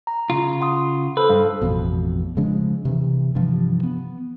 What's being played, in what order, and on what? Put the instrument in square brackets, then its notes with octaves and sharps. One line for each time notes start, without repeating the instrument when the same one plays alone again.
[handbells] A#5
[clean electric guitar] C#3 F4
[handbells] F#5 C6 D#6
[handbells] A4 C5 [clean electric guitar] B4
[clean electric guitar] G2 [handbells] F5
[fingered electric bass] A1 F2 B2
C#3 F3 G#3 D4
C3 E3
G2 C3 E3 F3
B3